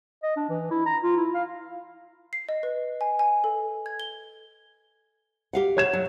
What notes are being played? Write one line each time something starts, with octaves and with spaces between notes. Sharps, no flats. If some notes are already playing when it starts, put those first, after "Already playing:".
D#5
D4
E3
E4
A#5
F4
E4
F5
C7
D#5
B4
G#5
G#5
A4
G#6
G7
G4 F5 F#5
C#5 G#6 E7
F#3